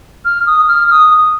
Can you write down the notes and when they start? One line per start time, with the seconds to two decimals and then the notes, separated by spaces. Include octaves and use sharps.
0.25 F6
0.46 D#6
0.68 F6
0.90 D#6
1.11 D#6